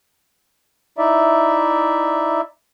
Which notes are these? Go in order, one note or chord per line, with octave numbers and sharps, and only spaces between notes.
D#4 E4 D5 E5